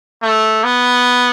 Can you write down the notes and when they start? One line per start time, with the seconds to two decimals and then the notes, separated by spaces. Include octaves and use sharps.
0.22 A3
0.64 B3